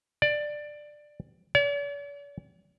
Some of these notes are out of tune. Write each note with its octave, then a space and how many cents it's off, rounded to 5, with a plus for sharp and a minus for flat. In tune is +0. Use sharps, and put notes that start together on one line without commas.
D5 +15
D5 -45